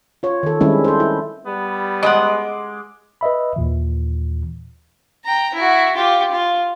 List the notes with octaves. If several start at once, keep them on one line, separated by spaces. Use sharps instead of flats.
F4 C#5
D#3 A4
D#3 G3 G#3 C4 C#4 E4
A4 C5
E4
G3 B3
G#3 D#5 F#5 D6
B4 D#5 E5 B5
D#2 A#2 E3
G5 A#5
E4 F#4
F4 G4
F4